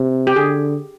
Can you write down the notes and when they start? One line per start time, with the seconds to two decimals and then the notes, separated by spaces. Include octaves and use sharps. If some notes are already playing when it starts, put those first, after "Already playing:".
Already playing: C3
0.27 G4
0.36 D3 G#4